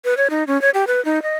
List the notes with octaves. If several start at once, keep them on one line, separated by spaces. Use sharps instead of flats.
B4
C#5
D#4
C#4
C#5
G4
B4
D#4
D#5